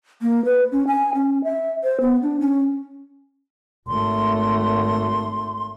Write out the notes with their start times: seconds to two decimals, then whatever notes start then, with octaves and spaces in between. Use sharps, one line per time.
0.22 A#3
0.45 B4
0.72 C#4
0.87 G#5
1.15 C#4
1.44 E5
1.84 C5
2.01 B3
2.23 D4
2.40 C#4
3.88 G#1 A3 C6